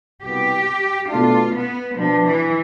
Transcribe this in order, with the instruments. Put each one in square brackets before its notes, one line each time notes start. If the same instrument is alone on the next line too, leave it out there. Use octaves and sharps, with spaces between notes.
[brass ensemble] C2 B2 B3 [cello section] G4
[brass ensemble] B2 A3 D4 [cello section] F4
[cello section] B3
[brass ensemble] B2 B3 D4 [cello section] F3
[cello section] E3